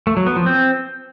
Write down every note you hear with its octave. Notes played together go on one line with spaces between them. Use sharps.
A3
F#3
B3
F3
C4